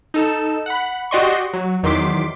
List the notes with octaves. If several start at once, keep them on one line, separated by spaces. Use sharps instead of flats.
D#4 A4 E7
F#5 B5
F#4 G4 D5 D#5 C6 C#6
F#3
E2 D#3 F#3 C6 D6 B6